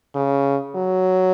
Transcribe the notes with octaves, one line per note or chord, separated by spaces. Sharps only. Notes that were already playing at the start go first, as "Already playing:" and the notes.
C#3
F#3